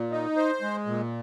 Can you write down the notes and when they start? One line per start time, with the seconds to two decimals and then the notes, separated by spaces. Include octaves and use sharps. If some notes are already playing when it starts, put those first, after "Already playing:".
Already playing: A#2
0.11 D#4
0.36 C5
0.61 G#3
0.86 A#2